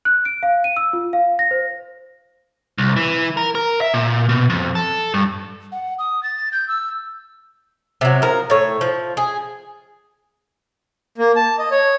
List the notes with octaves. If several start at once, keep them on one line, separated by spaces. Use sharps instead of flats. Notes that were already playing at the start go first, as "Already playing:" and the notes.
F#6
D7
F5
D#7
E6
F4
F5
A#6
C5
C2
E3
A#4
A#4
E5
A#2
B2
F2
A4
G2
F#5
D#6
A6
G6
E6
C3 F#3
F3 A#4
A2 C#5
F3
G#4
A#3
A5
D#5
C#5